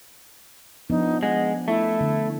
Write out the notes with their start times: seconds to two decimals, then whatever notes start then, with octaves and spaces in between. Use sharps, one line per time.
0.90 F3 B3 D4 D#4
1.23 G#3 F#5
1.68 A3 E4
2.00 D3